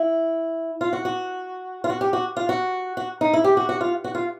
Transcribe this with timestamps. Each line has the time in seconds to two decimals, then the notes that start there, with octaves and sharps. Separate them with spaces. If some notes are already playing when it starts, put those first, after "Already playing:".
Already playing: E4
0.81 F4
0.93 F#4
1.05 F#4
1.84 F4
1.89 F#4
2.01 G4
2.13 F#4
2.37 F4
2.49 F#4
2.97 F#4
3.21 D#4
3.33 E4
3.44 G4
3.57 F#4
3.69 F#4
3.81 F4
4.04 F#4
4.15 F4